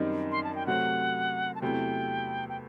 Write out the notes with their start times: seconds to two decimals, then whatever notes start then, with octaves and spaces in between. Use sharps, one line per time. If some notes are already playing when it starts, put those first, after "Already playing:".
Already playing: F#2 D#3 G3 C4 D#4
0.31 C6
0.44 A5
0.55 G5
0.67 C3 F#3 A3 C4 F#5
1.55 A5
1.62 E2 C3 F#3 A3 E4 G5
2.49 G5